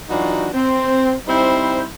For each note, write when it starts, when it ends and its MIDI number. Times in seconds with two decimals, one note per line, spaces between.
0.09 0.48 52
0.09 0.48 54
0.09 0.48 62
0.09 0.48 63
0.09 0.48 65
0.09 0.48 66
0.54 1.14 60
1.27 1.84 55
1.27 1.84 60
1.27 1.84 63
1.27 1.84 64
1.27 1.84 72